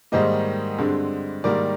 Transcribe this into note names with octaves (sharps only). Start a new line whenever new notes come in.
G#2 D#3 G3 A#3 C5 D#5
G2 D3 G#3 C4
G#2 D#3 G3 A#3 A#4 D5